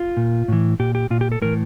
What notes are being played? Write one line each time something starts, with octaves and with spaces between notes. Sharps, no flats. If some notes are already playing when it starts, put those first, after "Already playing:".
Already playing: F4
A#2
A2 E3
A#2 G4
G4
A#2 F4
G4
A4
A2 E3 A#4